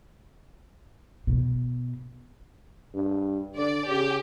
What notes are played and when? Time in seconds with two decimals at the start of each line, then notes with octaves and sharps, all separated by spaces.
1.27 B2
2.94 G2
3.56 D3 D5
3.89 C#3 G4